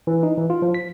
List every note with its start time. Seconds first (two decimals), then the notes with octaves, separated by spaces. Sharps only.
0.07 E3
0.23 D#4
0.37 E3
0.50 F4
0.62 F3
0.74 B6